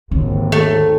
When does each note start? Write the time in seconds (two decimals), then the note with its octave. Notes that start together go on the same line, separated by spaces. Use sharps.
0.11 G#1 D#2 D3
0.52 A3